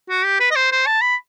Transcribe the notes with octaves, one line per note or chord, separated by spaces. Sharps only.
F#4
G4
B4
D#5
C5
C5
A5
B5